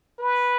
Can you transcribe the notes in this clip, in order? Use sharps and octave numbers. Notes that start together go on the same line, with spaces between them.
B4